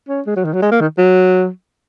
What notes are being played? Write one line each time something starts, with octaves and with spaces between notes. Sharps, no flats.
C#4
G#3
F#3
D#3
F#3
G#3
A#3
D#3
F#3